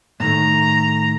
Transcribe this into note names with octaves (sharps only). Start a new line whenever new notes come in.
A2 D#3 A3 A#5